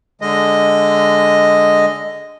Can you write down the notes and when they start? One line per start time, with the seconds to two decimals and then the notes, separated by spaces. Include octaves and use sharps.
0.21 D3 G#3 D#5